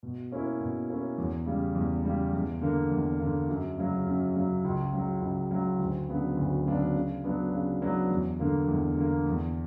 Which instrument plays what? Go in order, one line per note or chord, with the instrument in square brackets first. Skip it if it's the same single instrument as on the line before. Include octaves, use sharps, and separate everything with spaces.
[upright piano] B2
A#3 C#4 E4
B2
A#3 C#4 E4
E2
C#3 G3
E2
C#3 G3
E2
D3 A#3
E2
D3 A#3
F#2
C#3 F#3
F#2
C#3 F#3
C#2
C#3 F#3
C#2
C#3 F#3
D2
C#3 F#3 B3 D4
D2
C#3 F#3 B3 D4
C#3
F#3 B3 D4
C#3
F#3 B3 D4
E2
D3 A#3
E2
D3 A#3
E2